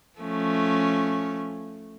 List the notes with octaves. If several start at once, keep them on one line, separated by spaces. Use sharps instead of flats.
F3 A3 C#4